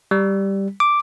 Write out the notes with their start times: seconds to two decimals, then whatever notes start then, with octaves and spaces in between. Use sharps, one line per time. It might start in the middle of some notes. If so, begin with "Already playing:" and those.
0.11 G3
0.80 D6